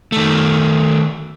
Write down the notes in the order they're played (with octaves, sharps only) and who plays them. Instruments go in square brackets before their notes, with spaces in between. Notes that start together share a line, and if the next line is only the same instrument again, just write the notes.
[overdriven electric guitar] D#3 A3